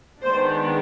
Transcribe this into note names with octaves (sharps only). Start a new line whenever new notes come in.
D#3 G#3 B3 D4 C5